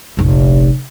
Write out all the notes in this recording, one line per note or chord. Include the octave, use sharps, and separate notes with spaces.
F1 A#1